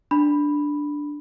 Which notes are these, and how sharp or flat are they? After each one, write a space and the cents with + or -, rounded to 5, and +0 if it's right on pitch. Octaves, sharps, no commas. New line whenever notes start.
D4 +0 B5 +0